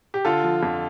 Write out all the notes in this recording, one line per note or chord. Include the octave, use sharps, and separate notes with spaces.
G4
D3 F4 A4
F3
F2